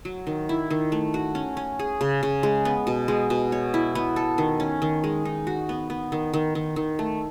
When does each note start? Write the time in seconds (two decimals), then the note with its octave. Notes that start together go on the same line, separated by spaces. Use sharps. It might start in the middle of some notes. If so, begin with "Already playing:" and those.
0.05 F#3
0.27 D#3
0.49 E4
0.70 D#3
0.92 A3
1.14 F#4
1.35 C#4
1.57 C#4
1.79 G#4
2.01 C#3
2.23 C#3
2.43 G#3
2.65 B3
2.87 B2
3.08 G#3
3.30 B2
3.52 C#5
3.74 E4
3.95 B3
4.16 A4
4.38 D#3
4.60 C#4
4.82 D#3
5.04 G#3
5.25 D#4
5.47 F#4
5.69 B3
5.90 B3
6.12 D#3
6.33 D#3
6.55 D#3
6.76 D#3
6.99 A3